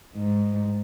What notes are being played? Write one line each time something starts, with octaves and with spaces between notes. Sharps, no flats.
G#2